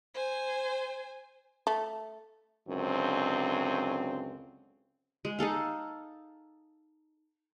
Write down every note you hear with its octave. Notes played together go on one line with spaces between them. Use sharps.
C5 G#5
A3
C#2 F#2 D3 C4
G#3
D#4 G#4 A4 F5